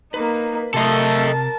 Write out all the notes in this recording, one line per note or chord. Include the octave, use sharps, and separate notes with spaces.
A#3 D#4 B4
C3 A3 A4 A#4 D#5 A5 C6